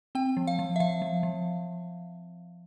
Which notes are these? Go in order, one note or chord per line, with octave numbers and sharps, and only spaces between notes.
C4 G5
F3
F5
F3
E5
F3 F5
F3
F3